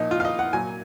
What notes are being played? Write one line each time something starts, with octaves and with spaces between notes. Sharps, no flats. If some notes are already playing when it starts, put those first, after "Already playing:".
Already playing: A#2 F3 D#4
F4
F5
D#5
F#5
A#2 F#3 G#5